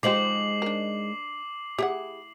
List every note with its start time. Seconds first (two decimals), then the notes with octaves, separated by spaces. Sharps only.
0.03 F3 G#3 D#4 G4 C5 D6 C7 F#7
0.62 D4 A#4
1.78 E4 G4 G#4 F#5